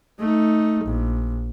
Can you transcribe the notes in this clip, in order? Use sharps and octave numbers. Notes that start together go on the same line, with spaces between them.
A3 D#4
A#1